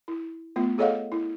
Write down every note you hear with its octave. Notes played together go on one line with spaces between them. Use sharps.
E4
A3 B3 F4
G#4 A4 C#5 D#5 F5 F#5
E4